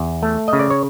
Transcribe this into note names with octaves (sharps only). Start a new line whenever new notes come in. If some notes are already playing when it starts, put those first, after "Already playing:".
Already playing: E2
A3
D#5
C#3
D5
C#5